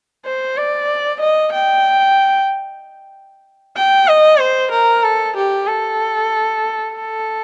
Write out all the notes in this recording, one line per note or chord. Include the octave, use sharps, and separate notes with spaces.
C5
D5
D#5
G5
G5
D#5
C5
A#4
A4
G4
A4
A4